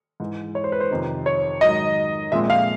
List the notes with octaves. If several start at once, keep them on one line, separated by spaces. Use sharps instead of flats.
G#2 E3 G#3
C#5
C5
B4
C5
F2 C3 D#3
C#5
G#2 D#3 F#3 D#5
A#2 F3 G#3 C4 E5
F5